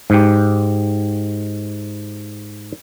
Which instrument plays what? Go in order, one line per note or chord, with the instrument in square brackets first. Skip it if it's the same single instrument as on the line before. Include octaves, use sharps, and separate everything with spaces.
[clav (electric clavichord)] G#2 G4